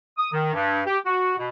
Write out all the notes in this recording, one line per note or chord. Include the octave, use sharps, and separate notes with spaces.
D#6
D#3
G2
G4
F#4
B2